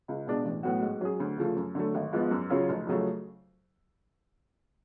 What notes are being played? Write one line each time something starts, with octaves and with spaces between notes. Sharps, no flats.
C#2
B2 G#3 D4
A1
A2 F#3 B3 F#4
G#2
F#3 C#4 G#4
D2
C#3 F3 A3
F#2
D3 F#3 A3
G#1
G#2 F3 B3
F#2
C#3 F#3 C#4 F4
F1
F2 C#3 F#3 A3